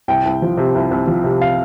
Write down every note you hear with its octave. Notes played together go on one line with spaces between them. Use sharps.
C2 G5
C2
F3
C3
C2
C2
F3
C3
F5